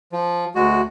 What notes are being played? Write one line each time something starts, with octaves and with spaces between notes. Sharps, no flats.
F3
D2 G#3 F#4